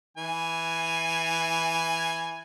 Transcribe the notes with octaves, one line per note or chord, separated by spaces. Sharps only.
E3 G#5